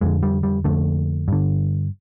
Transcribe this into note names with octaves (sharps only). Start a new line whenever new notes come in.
F2 D3 G#3
G3
G3
F2 D3 A3
G2 D3